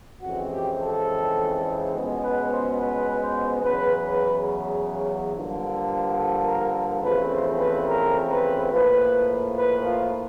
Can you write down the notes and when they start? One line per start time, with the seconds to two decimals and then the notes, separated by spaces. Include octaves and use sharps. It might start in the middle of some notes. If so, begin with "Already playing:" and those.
0.22 F2 C#3 E3 G#3 C4 F#4
0.51 G4
0.79 A4
1.92 C#2 B2 G#3 B3
2.21 B4
2.49 C5
2.77 B4
3.20 C5
3.62 E2 C#3 F#3 B4
4.05 B4
5.32 G2 D3 F3 A#3
6.17 A4
6.45 A#4
7.02 E2 C#3 F3 A3 C4 B4
7.30 C5
7.59 B4
7.87 A#4
8.29 B4
8.71 A2 F3 A#3 B4
9.56 B4
9.85 F4